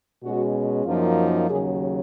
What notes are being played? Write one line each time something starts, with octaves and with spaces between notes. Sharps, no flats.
B2 G#3 C#4 F#4
F#2 F3 A#3 D#4 F4
D#2 C#3 F#3 G#4